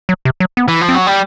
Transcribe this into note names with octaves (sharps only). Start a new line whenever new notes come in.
F#3
C3
F#3
B3
E3
F3
C4
F#3
G3